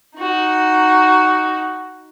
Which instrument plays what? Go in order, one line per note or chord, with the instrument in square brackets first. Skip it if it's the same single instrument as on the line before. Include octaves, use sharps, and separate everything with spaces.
[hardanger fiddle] D#4 F#4